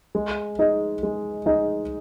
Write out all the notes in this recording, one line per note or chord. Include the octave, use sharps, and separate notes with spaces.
G#3
D#4 G#4 D#5
G#3
D#4 G#4 D#5